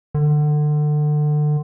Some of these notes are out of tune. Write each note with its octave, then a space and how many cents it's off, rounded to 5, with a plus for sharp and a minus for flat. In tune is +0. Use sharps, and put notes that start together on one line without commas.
D3 +30